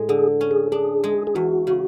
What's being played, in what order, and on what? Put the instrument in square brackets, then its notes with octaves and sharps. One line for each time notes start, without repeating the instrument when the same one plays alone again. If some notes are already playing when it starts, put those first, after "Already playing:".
Already playing: [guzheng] A2 G#3
[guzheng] D3 [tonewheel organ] G#4
[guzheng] C#4
[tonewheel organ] G#4
[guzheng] D4 [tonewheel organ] G#4
[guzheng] G#3
[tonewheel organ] G#4
[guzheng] E2 [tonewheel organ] F#4
[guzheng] C#3